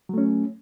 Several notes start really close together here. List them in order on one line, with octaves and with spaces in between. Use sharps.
F#3 A3 C#4